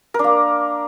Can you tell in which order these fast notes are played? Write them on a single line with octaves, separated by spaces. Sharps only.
A#4 D4 A#3